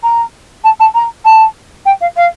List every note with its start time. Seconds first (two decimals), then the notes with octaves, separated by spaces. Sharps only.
0.03 A#5
0.64 A5
0.80 A5
0.95 A#5
1.25 A5
1.85 G5
2.01 F5
2.16 F5